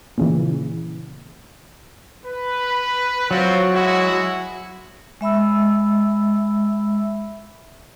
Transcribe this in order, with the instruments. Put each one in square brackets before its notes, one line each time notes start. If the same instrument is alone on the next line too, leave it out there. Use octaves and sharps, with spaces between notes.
[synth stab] A#2 C#3 E3
[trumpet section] B4
[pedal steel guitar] F#3 [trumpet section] C4 F4 F#4
[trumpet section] G#3 E4 F#4
[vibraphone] G#3 E5 B5 E6